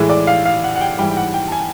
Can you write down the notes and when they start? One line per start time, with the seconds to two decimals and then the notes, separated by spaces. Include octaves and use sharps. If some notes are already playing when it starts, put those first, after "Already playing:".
Already playing: A2 E3 G#3
0.10 D5
0.27 F5
0.45 F5
0.64 F#5
0.75 F#5
0.81 G5
0.98 G#2 E3 G3 G5
1.11 G5
1.17 F#5
1.34 G5
1.48 A5
1.52 G#5